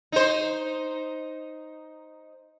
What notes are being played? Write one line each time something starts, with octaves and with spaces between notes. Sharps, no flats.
D#4 C5